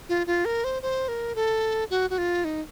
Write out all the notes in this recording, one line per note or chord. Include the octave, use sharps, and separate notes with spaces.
F4
F4
A#4
C5
C5
A#4
A4
F#4
F#4
F4
D#4